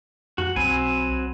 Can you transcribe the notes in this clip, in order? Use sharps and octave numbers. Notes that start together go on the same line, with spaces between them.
F2 F#4
B1 F#3 C4 G#5 B5